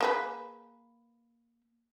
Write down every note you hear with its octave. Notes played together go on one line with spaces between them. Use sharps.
A#3 G#4 B4